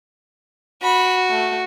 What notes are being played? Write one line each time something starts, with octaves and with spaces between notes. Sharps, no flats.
F#4 B5
A3